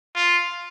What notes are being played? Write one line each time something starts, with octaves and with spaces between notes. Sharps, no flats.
F4